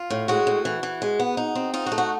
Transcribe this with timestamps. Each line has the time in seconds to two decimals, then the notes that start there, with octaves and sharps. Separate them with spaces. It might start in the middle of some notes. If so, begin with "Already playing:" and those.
Already playing: F4
0.10 A2
0.28 G#3 F#4
0.47 A2
0.65 E3
0.83 E3
1.02 G#3
1.19 B3
1.37 D#4
1.55 C4
1.74 D#4 F4
1.86 F#4
1.92 A3
1.98 F#4